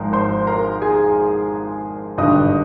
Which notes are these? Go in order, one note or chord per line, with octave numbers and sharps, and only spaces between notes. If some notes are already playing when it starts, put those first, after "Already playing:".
Already playing: G#1 G#2 F3 G#3 A#4
C5 C6
A#4 A#5
G#4 G#5
G#1 G2 D3 D#5 D#6